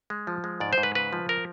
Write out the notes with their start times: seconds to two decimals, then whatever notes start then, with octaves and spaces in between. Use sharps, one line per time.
0.10 G#3
0.27 F3
0.44 G#3
0.60 G#2 D5
0.73 C5
0.78 G#2
0.83 B4
0.95 C#3 B4
1.13 F3
1.29 A#4